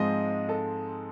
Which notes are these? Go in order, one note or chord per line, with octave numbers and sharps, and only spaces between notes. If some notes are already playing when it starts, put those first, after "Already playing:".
Already playing: G#2 F3 G#3 C4 D#5
A4